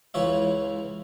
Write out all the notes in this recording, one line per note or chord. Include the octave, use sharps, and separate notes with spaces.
C#2 E3 F4 C#5 E5